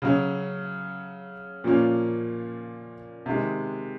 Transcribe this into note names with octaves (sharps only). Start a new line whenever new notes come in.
C#3 F#3 C#4
A#2 F3 A#3 C#4
C3 D#3 G#3